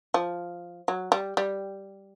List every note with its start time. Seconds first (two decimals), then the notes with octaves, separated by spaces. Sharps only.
0.14 F3
0.88 F#3
1.12 G3
1.37 G3